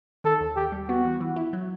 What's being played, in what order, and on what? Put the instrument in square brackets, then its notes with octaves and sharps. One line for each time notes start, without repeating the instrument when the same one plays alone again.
[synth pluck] D#3 [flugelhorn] A4
[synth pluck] D#2
[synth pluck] D#2 [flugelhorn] G4
[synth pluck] G3
[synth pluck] B3 [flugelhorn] F#4
[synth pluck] E3
E3
E4
F#3